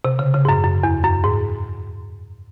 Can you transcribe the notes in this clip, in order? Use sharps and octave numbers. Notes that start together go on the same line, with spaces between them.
C3
C#3
C#3
G#2
F#2
F#2
E2
F#2
G#2